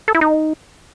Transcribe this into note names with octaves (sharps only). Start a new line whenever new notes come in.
A4
E4
D#4